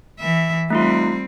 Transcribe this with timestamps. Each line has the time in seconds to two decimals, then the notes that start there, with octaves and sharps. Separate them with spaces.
0.20 E3 E5
0.70 G3 A3 C4 D#4 F4